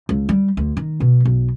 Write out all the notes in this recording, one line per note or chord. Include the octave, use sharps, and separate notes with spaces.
C#2
G3
D2
D#3
B2
B1